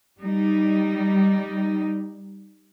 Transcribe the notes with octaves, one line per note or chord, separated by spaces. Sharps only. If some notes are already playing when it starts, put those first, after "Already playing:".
G3 D#4